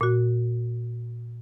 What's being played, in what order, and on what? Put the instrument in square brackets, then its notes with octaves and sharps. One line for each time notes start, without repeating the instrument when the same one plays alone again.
[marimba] A#2 F#4